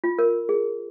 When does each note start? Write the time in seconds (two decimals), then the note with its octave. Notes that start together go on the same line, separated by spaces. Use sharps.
0.04 F4
0.19 A#4
0.49 G#4